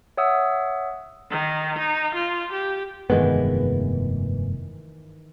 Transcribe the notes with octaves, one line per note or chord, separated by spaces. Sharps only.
C#5 E5 F#5 D#6 E6
D#3
D#4
F4
G4
F1 G2 D#3 E3 G#3 B3